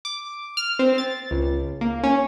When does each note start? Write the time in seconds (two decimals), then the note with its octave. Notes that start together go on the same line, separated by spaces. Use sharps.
0.05 D6
0.57 F6
0.79 C4
0.98 A6
1.31 C#2
1.81 A#3
2.03 C#4